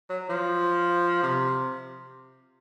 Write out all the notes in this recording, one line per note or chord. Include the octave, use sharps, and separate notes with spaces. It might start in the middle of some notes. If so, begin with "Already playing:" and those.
F#3
F3
C3